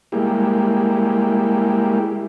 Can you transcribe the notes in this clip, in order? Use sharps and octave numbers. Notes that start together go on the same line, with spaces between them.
G3 G#3 A#3 E4 G4